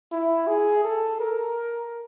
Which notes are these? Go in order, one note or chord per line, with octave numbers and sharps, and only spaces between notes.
E4
G#4
A4
A#4